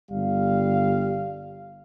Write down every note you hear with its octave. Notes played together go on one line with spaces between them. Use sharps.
G1 G3 F5